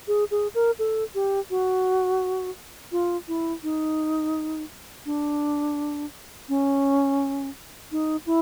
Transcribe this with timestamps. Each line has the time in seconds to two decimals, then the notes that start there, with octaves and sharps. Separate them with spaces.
0.08 G#4
0.31 G#4
0.55 A#4
0.79 A4
1.15 G4
1.50 F#4
2.92 F4
3.28 E4
3.63 D#4
5.06 D4
6.49 C#4
7.92 D#4
8.26 E4